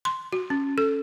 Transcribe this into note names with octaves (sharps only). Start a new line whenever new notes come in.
C6
F#4
C#4
A4